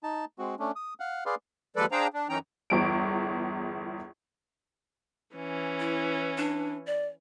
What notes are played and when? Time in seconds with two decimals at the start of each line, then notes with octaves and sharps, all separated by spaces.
0.03 D#4 A5
0.39 G#3 C4 F#4
0.59 A3 C#4 D4
0.76 D#6
1.00 F5 F#5
1.26 G#4 B4 D5 F5 C6
1.76 D#2 F3 G#3 A4 B4 D5
1.92 D4 G#4 C5 F5 G5 A#5
2.14 D4
2.29 F#2 E3 C#4 D#4 G5 A#5
2.70 G1 E2 D7
5.36 E3 C#4
5.80 E4
6.38 D4
6.86 D5